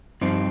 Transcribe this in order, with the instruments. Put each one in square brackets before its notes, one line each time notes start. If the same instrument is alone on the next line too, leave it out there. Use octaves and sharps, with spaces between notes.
[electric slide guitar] G2 F3 C4 D#4